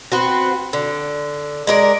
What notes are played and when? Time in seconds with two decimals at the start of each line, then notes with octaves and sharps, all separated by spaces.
0.12 B3 C4 F#4
0.73 D3
1.67 G#3 A#4 D5